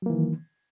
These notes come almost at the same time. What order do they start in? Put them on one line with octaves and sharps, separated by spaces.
F#3 A#3 E3 D#3